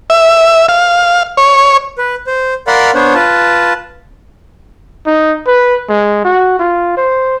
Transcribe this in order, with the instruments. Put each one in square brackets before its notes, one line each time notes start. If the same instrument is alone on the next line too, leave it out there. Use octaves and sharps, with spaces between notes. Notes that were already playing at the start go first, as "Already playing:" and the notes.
[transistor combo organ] E5
F5
C#5
[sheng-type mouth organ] B4
C5
A#4 D5 F5 F#5 B5 C6
B3 D4 C5 C#5
F4 B4 A5
[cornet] D#4
B4
G#3
F#4
F4
C5